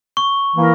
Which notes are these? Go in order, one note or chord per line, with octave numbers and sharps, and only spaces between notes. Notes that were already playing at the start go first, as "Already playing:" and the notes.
C#6
E3 A#3 E4 A#4